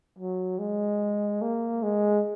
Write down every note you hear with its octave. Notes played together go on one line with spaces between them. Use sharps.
F#3
G#3
A#3
G#3